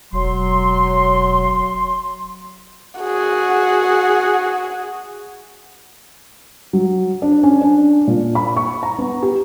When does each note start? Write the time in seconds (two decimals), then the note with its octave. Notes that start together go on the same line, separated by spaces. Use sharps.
0.13 E1 F#3 C6
3.00 F#4 G#4
6.73 F#3
7.22 D4
7.43 C#4
7.62 D4
8.07 A#2
8.35 B5
8.57 C#6
8.83 A#5
8.98 B3
9.23 G4